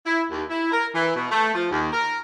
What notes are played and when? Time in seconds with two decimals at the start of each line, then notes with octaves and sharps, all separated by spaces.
0.05 E4
0.30 D#2
0.49 E4
0.71 A#4
0.95 E3
1.16 B2
1.30 A3
1.54 F3
1.70 D#2
1.92 A#4